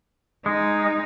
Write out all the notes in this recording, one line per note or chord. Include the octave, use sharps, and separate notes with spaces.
G#3 D#4